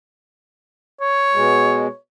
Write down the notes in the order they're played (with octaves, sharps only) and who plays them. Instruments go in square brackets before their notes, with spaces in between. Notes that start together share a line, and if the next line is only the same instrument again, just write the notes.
[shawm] C#5
[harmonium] B2 G#3